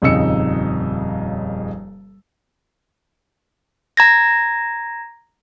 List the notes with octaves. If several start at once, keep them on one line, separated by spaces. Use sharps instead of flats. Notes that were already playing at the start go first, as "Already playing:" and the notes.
D#1 F2 C#3 D#4 E6 C#7
A#5 G#6 A#6